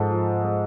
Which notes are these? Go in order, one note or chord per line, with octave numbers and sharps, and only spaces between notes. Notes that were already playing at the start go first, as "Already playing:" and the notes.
Already playing: G#2 F3 A4 C5
F3
G#3